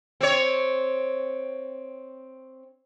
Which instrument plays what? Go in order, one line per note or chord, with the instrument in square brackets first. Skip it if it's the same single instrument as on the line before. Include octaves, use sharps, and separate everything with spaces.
[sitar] C4 C#5